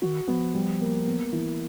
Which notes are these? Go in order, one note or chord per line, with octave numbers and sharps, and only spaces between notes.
D#3 F#4
F3 B3
G3
A#3
B3
E3